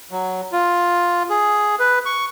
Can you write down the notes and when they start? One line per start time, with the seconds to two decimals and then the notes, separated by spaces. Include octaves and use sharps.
0.11 F#3
0.52 F4
1.30 G#4
1.80 B4
2.06 C#6